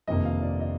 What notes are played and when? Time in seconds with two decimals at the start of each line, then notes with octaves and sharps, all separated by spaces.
0.07 G1 F2 C3 D#3 A#3 D#5
0.25 F5
0.42 D5
0.60 D#5